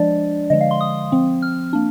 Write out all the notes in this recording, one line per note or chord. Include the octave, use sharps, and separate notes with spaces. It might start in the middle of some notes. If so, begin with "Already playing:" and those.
Already playing: F3 G#3 D4 D5
D3 F3 G#3 D#5
F5
C6
D#6
F3 C4
F6
A#3 D4